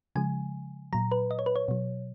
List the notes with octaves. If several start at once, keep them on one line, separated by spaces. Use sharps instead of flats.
C#3 F3 G#3 G#5
A#2 F#3 A#5
B4
D#5
C#5
B4
C#5
B2 F#3